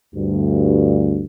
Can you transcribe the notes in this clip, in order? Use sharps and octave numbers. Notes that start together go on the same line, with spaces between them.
D2 G2